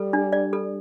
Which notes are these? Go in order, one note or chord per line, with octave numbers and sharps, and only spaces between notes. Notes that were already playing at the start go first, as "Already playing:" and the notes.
Already playing: G3 A4
D4
D5
A4